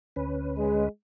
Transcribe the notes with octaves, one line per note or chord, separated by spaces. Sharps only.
D2 C#4 B4
G#3